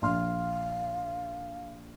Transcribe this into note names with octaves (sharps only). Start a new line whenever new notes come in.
A#1 F5 C6 F6